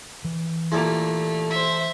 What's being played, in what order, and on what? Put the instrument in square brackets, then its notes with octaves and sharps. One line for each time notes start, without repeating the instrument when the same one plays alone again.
[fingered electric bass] E3
[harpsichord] A#2 G3 E4 [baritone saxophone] A3
[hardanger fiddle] C5 E5